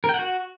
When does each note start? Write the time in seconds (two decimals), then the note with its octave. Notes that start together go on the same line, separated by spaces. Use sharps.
0.04 A#4
0.09 G5
0.14 F#5
0.19 F#4